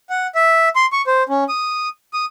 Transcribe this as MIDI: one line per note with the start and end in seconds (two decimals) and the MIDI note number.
0.10 0.27 78
0.35 0.69 76
0.76 0.86 84
0.92 1.02 85
1.07 1.23 72
1.29 1.44 61
1.49 1.89 87
2.13 2.25 87